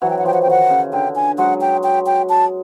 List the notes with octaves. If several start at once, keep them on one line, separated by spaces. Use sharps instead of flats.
E3 F#3 F#5
G5
F#5
F3 G5
F#5
G5
D#3 F#5
C#3
D3 G5
G#5
F#3 G#3 F#5
G5
G5
G5
A5